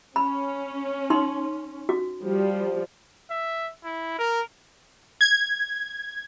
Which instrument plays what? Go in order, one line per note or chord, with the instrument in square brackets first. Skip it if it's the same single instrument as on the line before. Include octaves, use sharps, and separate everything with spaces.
[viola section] C#4 [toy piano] B5
[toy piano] D#4 C6
F#4
[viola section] F3 G3 G4
[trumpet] E5
E4
A#4
[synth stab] G#6